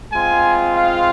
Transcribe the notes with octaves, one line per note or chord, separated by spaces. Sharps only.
G#3 C4 F4 G#5
F5